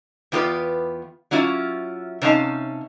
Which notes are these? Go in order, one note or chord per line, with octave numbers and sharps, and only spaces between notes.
E2 B3 F4 G4 B4
F#3 C#4 E4 F4
C3 C#4 D#4 F5 A5